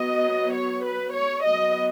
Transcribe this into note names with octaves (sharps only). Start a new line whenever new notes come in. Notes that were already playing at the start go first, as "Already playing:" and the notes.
Already playing: F#3 B3 D#5
C#5
B4
C#5
F#3 B3 D#5